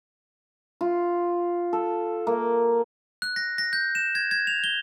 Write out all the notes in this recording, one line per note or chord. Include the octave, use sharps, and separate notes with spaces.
F4
A4
A#3
F#6
A#6
A#6
G6
E7
G#6
G#6
F7
G7